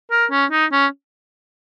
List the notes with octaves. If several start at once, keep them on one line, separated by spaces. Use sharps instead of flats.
A#4
C#4
D#4
C#4